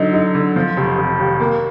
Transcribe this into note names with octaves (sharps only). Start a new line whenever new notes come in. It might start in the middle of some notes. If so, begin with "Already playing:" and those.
Already playing: D3 F#3 D#4
D#4
D3
F3
F1
F1
D#2
A#3